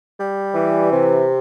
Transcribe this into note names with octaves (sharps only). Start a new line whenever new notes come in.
G3
E3
C3